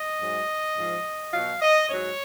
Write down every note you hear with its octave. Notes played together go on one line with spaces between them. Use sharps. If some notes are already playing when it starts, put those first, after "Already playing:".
Already playing: D#5
G#2 F#3
G#2 F3
B2 F#3 F5
D#5
G#2 F#3 C#5